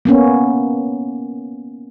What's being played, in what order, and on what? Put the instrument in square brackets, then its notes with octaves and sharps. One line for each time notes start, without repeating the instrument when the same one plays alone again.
[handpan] A#3 B3 C#4